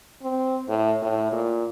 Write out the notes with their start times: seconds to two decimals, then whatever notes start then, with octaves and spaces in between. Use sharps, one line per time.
0.22 C4
0.68 A2
1.02 A2
1.32 A#2